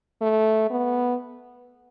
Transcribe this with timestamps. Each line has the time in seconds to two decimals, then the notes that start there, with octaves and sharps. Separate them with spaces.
0.21 A3
0.71 B3